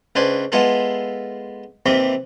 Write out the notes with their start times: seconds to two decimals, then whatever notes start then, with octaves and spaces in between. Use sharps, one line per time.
0.15 C#2 D4 B4 C5 G#5
0.52 G#3 B3 E4 F4 G#4 A4
1.86 D#2 C3 E3 C4 B5 D6